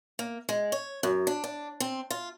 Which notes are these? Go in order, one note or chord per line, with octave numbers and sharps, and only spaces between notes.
A#3
G#3
C#5
F#2
D4
D4
C4
F4